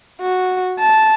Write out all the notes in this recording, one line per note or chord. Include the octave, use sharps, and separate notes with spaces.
F#4
A5